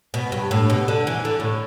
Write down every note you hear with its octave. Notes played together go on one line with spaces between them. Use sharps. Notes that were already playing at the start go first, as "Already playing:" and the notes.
B2
G2
A2
B2
D3
E3
D3
A2